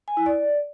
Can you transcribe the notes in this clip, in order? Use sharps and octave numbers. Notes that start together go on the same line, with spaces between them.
G#5
E4
D5